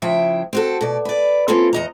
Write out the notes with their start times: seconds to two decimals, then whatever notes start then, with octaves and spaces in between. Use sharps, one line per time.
0.02 C#3 F3 E4 E5 G5
0.53 C4 F#4 A4
0.81 B2 D5
1.05 B4 D5
1.48 A#3 C4 C#4 E4 F4 A4
1.73 E2 D#5 A#5